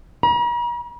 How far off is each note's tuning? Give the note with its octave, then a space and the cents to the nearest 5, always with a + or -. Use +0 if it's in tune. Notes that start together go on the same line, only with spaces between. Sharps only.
A#5 +45